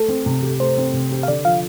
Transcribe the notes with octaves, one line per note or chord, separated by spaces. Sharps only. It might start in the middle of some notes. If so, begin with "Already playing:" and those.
Already playing: A3 A4
C4
C3
G4
A3 C5
C4
C3
G4
F5
D3 D5
F3 F5